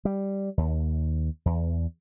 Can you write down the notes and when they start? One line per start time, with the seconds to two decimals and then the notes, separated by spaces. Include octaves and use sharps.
0.05 G3
0.58 D#2
1.46 E2